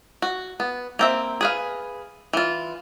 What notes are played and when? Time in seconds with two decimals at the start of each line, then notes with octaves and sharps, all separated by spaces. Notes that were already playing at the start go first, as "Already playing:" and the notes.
0.22 F#4
0.60 B3
0.99 A#3 C4 E5
1.41 G#4 B4 F5
2.33 E3 F4